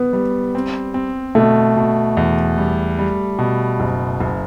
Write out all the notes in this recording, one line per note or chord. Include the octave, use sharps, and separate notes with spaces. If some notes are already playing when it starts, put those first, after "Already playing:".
Already playing: B3
G3
C4
C4
B2 A3
B2
E2
G3
G3
B2
F#1
F#1